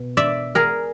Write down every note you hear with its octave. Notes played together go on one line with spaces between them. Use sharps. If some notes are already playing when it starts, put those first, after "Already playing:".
Already playing: B2
D5 E5
G#4 A#4